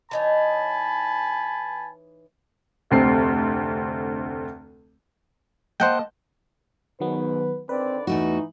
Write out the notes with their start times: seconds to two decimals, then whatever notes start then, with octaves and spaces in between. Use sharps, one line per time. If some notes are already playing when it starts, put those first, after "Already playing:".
0.11 E3 D#4 C#5 G#5 A5 B5
2.91 F1 D2 C4 C7
5.80 A#3 C5 D#5 F#5 G5 A5
7.00 G#2 B2 D#3 F#3 B3 B4
7.69 D3 D#3 C4 B4 D5
8.07 E2 E3 A3 D#4 F#4